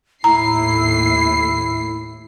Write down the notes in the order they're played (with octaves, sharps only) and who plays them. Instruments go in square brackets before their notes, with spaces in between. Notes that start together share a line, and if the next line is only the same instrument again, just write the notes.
[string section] D#2 A2 C7 [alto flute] E4 [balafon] A#5